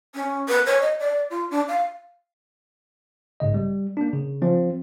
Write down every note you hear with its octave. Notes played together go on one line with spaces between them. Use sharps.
C#4
B4
C#5
D#5
D5
F4
D4
F5
A#1 G#2 C#3 D#5
G3
A#3 D4
C#3
F3 C4